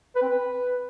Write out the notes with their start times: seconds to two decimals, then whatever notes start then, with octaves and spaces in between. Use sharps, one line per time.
0.16 B4
0.22 C4
0.29 B4